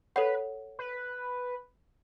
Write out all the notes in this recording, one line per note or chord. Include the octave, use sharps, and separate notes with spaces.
A4 B4 C#5 F#5
B4